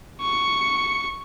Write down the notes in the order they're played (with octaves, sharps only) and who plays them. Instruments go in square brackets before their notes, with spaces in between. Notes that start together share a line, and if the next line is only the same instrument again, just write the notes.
[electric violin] C#6 C#7